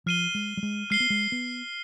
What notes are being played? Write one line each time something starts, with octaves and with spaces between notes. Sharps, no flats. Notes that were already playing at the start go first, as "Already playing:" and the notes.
F3 F6 C7 D#7 G7
G#3
G3
G#3
G#3 F6 C7 D#7 G7
B3
G#3
B3